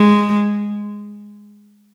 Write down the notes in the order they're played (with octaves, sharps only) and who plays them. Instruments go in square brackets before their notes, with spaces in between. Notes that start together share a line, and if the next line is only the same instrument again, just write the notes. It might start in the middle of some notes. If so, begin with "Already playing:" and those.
Already playing: [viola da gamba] G#3